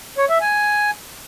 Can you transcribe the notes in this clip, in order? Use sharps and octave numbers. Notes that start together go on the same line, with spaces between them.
C#5
E5
G#5